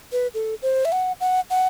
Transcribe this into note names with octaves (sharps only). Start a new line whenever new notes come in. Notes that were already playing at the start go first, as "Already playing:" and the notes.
B4
A4
C5
E5
F#5
F#5
F#5